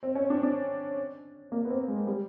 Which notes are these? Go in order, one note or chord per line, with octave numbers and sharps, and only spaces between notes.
C4
C#4
D4
D4
A#3
B3
C4
G#3
G3